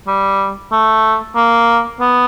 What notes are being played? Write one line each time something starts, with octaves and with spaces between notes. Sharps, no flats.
G3
A3
A#3
B3